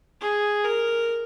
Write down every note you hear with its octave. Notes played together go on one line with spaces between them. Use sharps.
G#4
A#4